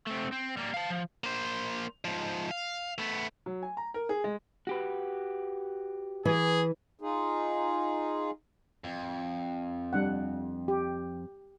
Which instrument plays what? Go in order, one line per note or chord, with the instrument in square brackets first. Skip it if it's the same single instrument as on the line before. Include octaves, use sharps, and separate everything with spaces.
[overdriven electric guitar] A3 C4
C4
G3 A#3
F5 A5
F3
[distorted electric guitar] A#3 C5
G#2 F3
F5
A3 B3
[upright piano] F#3
G#5
A#5
A#4
G#4
G#3
[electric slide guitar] F#4 G4 B4
[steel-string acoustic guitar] E3 [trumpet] G#4
[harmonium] D#4 F4 G#4
[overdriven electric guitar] F2
[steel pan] G3 D4 F#5
G4